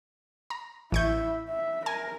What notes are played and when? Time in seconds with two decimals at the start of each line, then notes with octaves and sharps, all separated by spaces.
0.50 A#5
0.92 A1 E4 E5 C#6 G6
1.49 E5
1.86 A#4 G#5